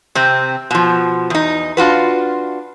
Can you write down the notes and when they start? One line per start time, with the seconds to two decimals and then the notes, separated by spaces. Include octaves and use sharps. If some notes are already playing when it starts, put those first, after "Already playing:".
0.15 C3 C4
0.71 B2 F3
1.30 E2 D#4
1.77 D4 F4 F#4 B4